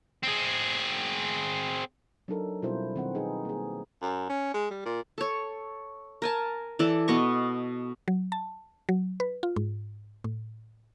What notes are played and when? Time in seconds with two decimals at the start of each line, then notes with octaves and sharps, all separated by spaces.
0.23 C4 G#4
2.28 F#3 D4 D#4 A4 A#4
2.62 B2 G3 C4 E4 F4 C5
2.96 D#3 C4 F#5
3.15 D#4 G#4 B4
3.45 A#3 G#4
4.02 F#2
4.29 C#4
4.54 G#3
4.71 G3
4.86 A#2
5.18 A4 C#5
6.22 A#4 G#5 A5
6.79 E3 A4 D5
7.08 B2 B3 D#5 C#6
8.08 F#3
8.32 A5
8.89 F#3
9.20 B4
9.43 F4
9.56 G#2
10.24 A2